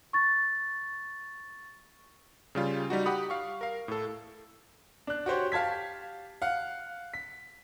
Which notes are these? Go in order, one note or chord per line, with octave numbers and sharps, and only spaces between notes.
C#6 A6
C#3 G3 F4
G3 D#4 F#4
G4 F#5 B5 D#6
F5 C#6
A#4 F5
A2 A4
D4 F#6
F#4 G4 C5 C#5
G4 F5 A5 G#6 B6
F5 F#5
B6